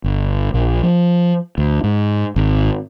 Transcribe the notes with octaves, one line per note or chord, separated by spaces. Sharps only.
G1
A#1
F3
D2
G#2
G#1